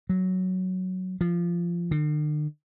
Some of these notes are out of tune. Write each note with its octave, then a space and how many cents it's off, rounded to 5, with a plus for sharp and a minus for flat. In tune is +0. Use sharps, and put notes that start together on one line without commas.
F#3 +5
F3 -15
D3 +45